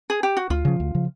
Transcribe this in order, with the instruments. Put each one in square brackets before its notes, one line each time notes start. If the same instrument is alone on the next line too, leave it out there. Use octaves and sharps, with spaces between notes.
[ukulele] G#4
G4
F#4
[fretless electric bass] D2 [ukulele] F4
[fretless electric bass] C#3 F3
D2
C#3 F3